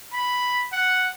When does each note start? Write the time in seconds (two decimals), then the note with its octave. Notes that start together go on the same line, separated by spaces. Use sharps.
0.13 B5
0.72 F#5